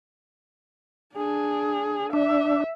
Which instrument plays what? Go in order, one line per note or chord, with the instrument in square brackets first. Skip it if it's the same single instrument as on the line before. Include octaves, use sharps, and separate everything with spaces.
[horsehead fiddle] D4 G#4
[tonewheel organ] D4 [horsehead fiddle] E5